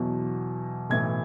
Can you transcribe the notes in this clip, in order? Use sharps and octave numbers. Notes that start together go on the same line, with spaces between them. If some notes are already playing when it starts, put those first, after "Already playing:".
Already playing: E2 B2 F#3
B1 A2 E3 G#6